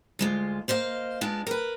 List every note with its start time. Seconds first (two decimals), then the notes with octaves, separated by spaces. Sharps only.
0.19 D2 G#3 F4
0.68 A#3 C5 D#5 F5
1.21 G#3 B3 D4 F4
1.47 A#4 B4